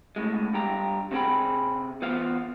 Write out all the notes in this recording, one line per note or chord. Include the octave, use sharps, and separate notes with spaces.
C#2 A2 G#3
G2 G4 A#5
C3 C4 G#4 G5 B5
E2 B3 F4 C5 F5